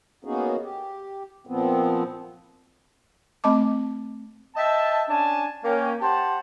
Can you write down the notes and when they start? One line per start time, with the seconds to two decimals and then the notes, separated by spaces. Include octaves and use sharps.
0.25 A#3 B3 C#4 D#4 F#4 G#4
0.62 G4
1.47 A#2 F3 B3 C4
3.44 A3 C4 D#5 A5 D6
4.56 D#5 E5 G5 A5
5.08 C#4 D4 G#5 A5
5.64 A#3 C#4 G5
6.01 G4 C5 F#5 A5